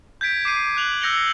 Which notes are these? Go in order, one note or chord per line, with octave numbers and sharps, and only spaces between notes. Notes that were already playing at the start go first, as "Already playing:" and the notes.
G6 G#6 B6 D7
D6 C7 D#7
F#6 F7 F#7
E6 G6 A#6 C#7 F7 G7